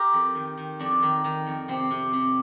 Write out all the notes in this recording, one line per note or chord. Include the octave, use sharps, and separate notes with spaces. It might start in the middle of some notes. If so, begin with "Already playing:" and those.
Already playing: G4 A#4
F2
D#3
D#3
F2 D4
D#3
D#3
F2
C3 C4
C3
C3